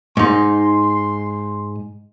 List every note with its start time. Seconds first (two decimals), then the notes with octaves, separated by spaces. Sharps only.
0.17 G#2 D#4 C6